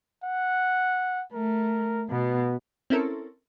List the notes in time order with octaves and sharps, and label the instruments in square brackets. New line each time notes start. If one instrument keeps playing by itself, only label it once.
[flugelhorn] F#5
[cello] A3 [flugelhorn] A#4
[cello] B2 [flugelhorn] B3
[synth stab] C4 C#4 E4 A4 A#4